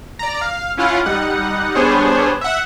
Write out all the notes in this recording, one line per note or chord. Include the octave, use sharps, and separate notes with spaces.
D5 A#5
F5
C#4 E4 F4 F5 F#5
G3 D#4 F#5
G3 B3 D4 G#4 C5 C#5
E5 F#5